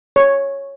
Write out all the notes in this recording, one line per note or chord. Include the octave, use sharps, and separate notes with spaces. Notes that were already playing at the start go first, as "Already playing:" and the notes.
C#5